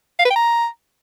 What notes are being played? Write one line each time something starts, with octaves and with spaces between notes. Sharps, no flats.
F5
B4
G5
A#5